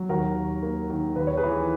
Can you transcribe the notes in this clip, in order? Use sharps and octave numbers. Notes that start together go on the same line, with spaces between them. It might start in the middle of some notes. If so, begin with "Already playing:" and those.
Already playing: F#3
D#2 F#4 A#4
D#2
A#3
D#3
D#2 B4
C#5
G#4 B4
E3